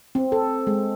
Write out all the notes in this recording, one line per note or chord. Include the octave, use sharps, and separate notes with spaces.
C4
A4
G#3